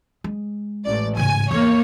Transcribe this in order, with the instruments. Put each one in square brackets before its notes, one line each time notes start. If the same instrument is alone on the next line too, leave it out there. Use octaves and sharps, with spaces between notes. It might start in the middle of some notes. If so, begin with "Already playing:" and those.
[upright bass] G#3
[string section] A1 D5
[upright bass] G#2 C#3 [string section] G#5
[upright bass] E2 [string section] A#3 C#5